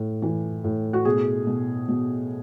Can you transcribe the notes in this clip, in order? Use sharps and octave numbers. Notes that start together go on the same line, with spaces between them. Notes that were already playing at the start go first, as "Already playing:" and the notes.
Already playing: A2
E3
A2
F#4
B2 G#4
B2
B2